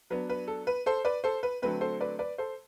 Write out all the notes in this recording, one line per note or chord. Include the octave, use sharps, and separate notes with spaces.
F#3 B3 D4 B4
B4
A4
B4
A4 C5
B4 D5
A4 C5
B4
D3 F#3 A3 C4 B4
A4 C5
B4 D5
B4 D5
A4 C5